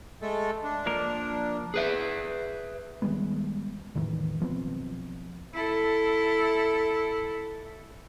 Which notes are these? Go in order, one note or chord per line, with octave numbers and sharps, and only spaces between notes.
G#3 A3 A4
D4
F3 A#3 A#4
G#4 B4 E5
D#3 G3 G#3 B3
E2 A2 D#3 E3
B1 F3 B3 C4
E4 A4